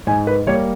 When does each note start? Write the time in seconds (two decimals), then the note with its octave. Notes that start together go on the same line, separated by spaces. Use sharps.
0.07 G#2 G#5
0.27 B4
0.47 G3 A#3 C#5